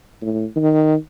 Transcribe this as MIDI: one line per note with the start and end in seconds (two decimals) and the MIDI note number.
0.22 0.45 45
0.56 0.96 51